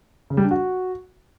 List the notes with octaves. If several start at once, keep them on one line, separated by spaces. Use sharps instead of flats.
C#3
G3
D4
F#4